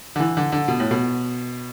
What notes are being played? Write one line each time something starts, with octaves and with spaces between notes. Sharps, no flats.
D3
E3
D3
D3
B2
A2
B2